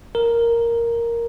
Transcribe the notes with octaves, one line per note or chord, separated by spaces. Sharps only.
A#4